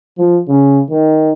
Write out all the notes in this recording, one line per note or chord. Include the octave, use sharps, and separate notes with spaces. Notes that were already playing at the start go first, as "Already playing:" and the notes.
F3
C#3
D#3